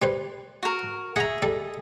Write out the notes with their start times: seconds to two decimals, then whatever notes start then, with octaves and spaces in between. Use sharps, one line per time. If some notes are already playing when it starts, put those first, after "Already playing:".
0.02 G3 B4 C5
0.63 F#4 A#4
1.16 G#4 D#5 E5 F#5 A#5
1.42 G3 A4